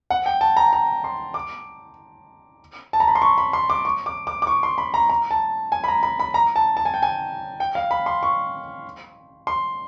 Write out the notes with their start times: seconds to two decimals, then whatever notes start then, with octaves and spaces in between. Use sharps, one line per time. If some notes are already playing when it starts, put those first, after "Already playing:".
0.10 F#5
0.26 G5
0.41 A5
0.57 A#5
0.73 A#5
1.04 C6
1.34 D6
2.93 A5
3.00 A#5
3.08 B5
3.15 C6
3.22 C#6
3.38 B5
3.53 C6
3.70 D6
3.85 C#6
4.06 D6
4.27 D6
4.42 D6
4.47 C#6
4.63 C6
4.78 B5
4.94 A#5
5.09 A#5
5.31 A5
5.72 G#5
5.84 B5
5.88 A#5
6.03 B5
6.20 B5
6.34 A#5
6.56 A5
6.77 A5
6.85 G#5
6.94 G5
7.02 G#5
7.60 G5
7.75 F5
7.91 B5
8.06 C6
8.23 C#6
9.47 C6